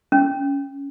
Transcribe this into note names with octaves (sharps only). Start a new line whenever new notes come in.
C#4